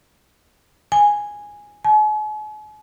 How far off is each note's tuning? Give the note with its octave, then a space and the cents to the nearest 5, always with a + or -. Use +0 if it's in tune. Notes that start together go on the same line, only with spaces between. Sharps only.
G#5 -5
G#5 +45